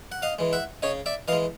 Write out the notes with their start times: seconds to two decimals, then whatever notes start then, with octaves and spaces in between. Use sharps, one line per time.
0.12 F#5
0.22 D#5 F5
0.39 E3 G#3
0.53 E5 F#5
0.82 C#3 C#5 D#5
1.06 D5 E5
1.28 E3 D#5 F5
1.33 G#3